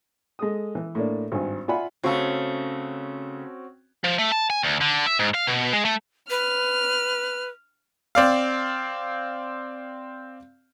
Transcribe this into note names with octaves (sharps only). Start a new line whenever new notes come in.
G#3 A4 D#6
E3
A2 A#3 D4
G#1 G2 G#5
F4 D5 E5 F#5 G#5 B5
C#3 A3 C4 C#4 F#4
F3
A3
A5
G#5
D2
D3
E5
G#2
F5
B2
G#3
A3
B4 F6
C4 D5 F5